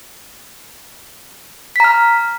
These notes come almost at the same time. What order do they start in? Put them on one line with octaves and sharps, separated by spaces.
B6 A#5 F6